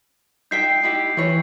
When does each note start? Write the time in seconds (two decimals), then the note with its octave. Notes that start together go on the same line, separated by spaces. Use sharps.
0.51 D#4 E5 G5 G6 C7
0.83 D#4 E4 G4
1.17 E3 E4 C#5